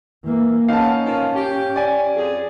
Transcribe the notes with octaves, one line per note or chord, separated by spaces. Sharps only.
E3 A#3
B3 C#4 D#4 F5 A5
D#3 F3 F4
G4
D5 G#5
F2 F3 G#4